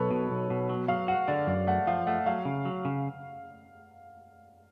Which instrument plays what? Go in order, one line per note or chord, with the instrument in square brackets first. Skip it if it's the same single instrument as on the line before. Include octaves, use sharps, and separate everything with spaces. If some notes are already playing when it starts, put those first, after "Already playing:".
Already playing: [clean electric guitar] B1 [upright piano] A4 B4 C#5
[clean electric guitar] B2
B1
B2
F#3
[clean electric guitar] F#3 [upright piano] F5
[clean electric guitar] F#4 [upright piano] F#5
[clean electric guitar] D3 [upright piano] D5
[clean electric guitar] F#2 [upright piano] D5
[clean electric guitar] A3 [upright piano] F#5
[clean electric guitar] F3 [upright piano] F5
[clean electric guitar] A3 [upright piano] F#5
[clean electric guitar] F#3 [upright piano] F5
[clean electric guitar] C#3
F#3
C#3